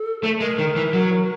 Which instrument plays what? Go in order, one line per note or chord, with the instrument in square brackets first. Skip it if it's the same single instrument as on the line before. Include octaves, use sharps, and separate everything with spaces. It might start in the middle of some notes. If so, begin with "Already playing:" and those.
Already playing: [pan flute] A4
[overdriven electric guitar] A3
[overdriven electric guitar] G#3 [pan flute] A#4
[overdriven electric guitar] D#3
E3
F#3